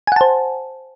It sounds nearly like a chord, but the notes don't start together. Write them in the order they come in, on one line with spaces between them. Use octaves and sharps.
G#5 F#5 A5 C5